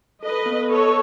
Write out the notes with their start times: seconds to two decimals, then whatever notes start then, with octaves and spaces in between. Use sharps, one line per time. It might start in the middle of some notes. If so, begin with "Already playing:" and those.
0.23 A4 B4 D#5
0.46 B3
0.69 B3 A4 C#5